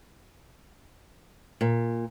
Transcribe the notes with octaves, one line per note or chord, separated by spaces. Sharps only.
A#2